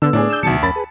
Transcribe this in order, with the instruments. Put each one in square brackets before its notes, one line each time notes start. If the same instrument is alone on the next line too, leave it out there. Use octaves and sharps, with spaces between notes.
[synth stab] D3 [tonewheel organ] B3 [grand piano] E6
[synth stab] A2 [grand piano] D4 G#4
[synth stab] E6 G6
[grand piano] D2 C#7 [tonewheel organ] B2 D#3 F#3 [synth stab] A5
[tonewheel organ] F2 C#4 A#4 [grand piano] B5 A6
[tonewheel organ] G#4 B4